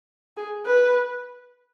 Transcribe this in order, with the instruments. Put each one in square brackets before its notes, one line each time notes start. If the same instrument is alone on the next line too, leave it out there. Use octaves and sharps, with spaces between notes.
[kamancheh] G#4
B4